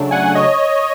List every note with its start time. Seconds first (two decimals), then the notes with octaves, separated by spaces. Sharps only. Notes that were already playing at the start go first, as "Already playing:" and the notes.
Already playing: C#3 F#3 A3 D4
0.11 F#5 G#5
0.35 C#5 D#5